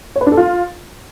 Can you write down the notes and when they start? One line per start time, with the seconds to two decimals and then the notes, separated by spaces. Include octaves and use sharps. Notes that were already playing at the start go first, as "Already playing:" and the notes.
0.16 C#5
0.21 B4
0.26 D4
0.32 A4
0.37 F4